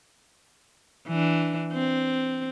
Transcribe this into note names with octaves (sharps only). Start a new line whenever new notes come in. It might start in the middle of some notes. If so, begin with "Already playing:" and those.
E3 D4
C4